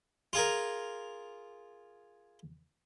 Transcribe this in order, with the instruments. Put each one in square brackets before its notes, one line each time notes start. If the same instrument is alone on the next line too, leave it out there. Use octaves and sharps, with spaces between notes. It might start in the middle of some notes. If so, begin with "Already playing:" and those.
[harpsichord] F4 G#4 A#4